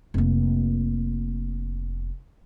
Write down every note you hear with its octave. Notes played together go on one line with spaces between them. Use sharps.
F1 A#3